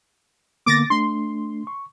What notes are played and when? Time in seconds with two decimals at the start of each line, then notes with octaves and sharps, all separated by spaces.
0.66 D3 A#3 B3 D6 A6 A#6
0.90 A3 D4 C6
1.67 C#6